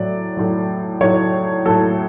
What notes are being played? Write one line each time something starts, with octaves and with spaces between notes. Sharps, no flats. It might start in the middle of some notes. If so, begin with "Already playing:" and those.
Already playing: A2 F#3 D5
A2 F#3
A2 F#3 C#5
A2 F#3 A4